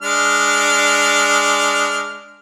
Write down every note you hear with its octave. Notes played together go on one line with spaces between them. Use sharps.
G#3 D4 F6